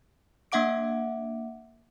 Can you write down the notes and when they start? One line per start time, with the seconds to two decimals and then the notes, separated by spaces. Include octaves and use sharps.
0.52 A#3 D4 E5 F#5 D6 D7